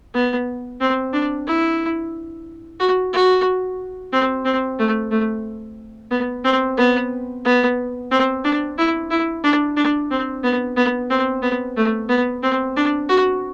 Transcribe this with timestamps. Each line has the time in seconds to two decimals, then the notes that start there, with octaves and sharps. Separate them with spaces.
0.14 B3
0.81 C4
1.13 D4
1.47 E4
2.80 F#4
3.13 F#4
4.13 C4
4.45 C4
4.79 A3
5.11 A3
6.11 B3
6.44 C4
6.78 B3
7.45 B3
8.11 C4
8.44 D4
8.78 E4
9.10 E4
9.44 D4
9.76 D4
10.10 C4
10.44 B3
10.77 B3
11.10 C4
11.42 B3
11.77 A3
12.09 B3
12.43 C4
12.76 D4
13.09 F#4